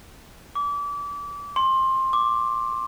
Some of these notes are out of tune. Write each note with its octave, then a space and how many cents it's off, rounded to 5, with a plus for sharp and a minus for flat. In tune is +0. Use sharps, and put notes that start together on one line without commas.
D6 -30
C6 +20
D6 +0